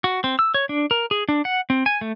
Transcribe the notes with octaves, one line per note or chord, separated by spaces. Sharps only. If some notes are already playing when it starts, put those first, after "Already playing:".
F#4
C4
E6
C#5
D4
A#4
G#4
D4
F#5
C4
G#5
A3